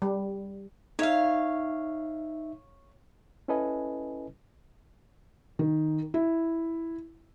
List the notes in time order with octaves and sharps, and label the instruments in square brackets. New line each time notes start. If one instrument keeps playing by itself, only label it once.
[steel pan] G3
[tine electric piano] D#4 E5 [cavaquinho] C#5 F5
[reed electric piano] C#4 E4 A4 B4 D#5 G#5
[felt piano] D#3
E4